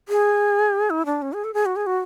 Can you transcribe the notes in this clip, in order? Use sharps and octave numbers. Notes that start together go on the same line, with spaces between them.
G#4
E4
D4
C#4
G#4
A4
G#4
F#4
G#4
F#4